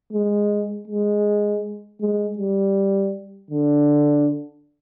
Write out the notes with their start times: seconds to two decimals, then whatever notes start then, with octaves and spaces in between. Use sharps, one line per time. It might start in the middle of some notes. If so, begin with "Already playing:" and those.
0.13 G#3
0.88 G#3
2.01 G#3
2.38 G3
3.50 D3